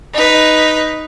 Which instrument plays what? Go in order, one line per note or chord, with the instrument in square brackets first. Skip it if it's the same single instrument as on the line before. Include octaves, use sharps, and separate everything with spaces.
[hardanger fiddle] D#4 B4